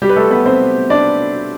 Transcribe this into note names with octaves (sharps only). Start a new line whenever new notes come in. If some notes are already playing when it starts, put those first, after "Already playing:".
G3 G4
B4
A3 A4
B3 B4
C4 C5
D4 D5